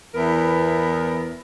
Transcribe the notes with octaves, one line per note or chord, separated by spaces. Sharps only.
E2 B3 E4 A#4